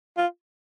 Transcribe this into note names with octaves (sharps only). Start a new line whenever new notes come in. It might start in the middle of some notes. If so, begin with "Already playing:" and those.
F4